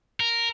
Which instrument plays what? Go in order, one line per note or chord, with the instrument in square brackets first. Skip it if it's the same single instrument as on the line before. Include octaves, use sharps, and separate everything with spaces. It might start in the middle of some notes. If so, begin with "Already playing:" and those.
[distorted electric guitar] A#4